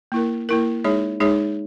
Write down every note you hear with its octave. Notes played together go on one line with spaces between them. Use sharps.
A#3 E4 A#4
A#3 E4 A#4
G#3 D#4 G#4 C#5
G#3 D#4 G#4 C#5